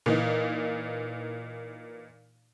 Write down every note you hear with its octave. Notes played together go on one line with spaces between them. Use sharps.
A#2 E3 D#4